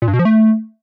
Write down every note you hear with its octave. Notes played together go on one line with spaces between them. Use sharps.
A#2
G2
B2
F3
A3